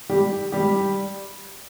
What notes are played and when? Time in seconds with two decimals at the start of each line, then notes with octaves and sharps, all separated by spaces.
0.09 G3 G4
0.52 G3 G4